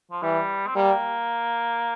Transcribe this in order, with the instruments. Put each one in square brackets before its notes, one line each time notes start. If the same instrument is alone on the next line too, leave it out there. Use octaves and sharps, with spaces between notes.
[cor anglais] F3
[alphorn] E3 [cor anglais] G3
[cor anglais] C4
[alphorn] G3 [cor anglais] A#3